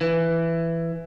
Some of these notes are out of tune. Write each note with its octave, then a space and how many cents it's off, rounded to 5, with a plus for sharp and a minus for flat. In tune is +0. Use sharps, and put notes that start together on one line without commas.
E3 +10